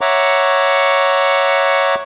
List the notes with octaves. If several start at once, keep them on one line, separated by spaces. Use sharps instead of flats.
C#5 E5 F#5 A#5 C#6 D6